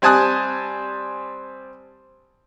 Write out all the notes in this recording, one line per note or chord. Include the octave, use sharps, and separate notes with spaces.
G3 C4 G#5 A5 D#6 F#6